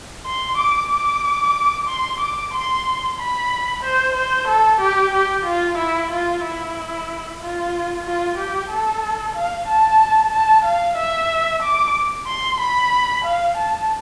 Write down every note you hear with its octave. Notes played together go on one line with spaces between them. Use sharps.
C6
D6
D6
C6
D6
C6
B5
C5
C5
A4
G4
G4
F4
E4
F4
E4
F4
F4
G4
A4
F5
A5
A5
F5
E5
D6
C6
B5
F5
A5